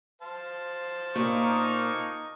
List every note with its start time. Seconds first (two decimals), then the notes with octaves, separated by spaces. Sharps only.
0.22 C5 F5 A5
1.16 A#2 A#3 D#4 C#6